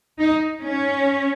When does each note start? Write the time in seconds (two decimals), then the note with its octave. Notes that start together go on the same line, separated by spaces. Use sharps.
0.18 D#4
0.62 C#4